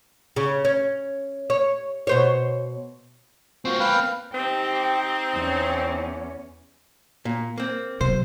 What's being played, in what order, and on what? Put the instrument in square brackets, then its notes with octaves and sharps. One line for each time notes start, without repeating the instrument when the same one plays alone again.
[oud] C#3
C#4
C#5
B2 C5 C#5
[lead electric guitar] A#3 C4 [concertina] F4 F#4 C5
[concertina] B4 F5 G5
[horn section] C4 D#4 [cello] G4 G5
[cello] E2 C#4
[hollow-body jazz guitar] A#2
A#3 C4
[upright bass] C3 F#3 [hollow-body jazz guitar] C5